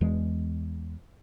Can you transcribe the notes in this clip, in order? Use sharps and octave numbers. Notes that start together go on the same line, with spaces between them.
E2 E3 G#3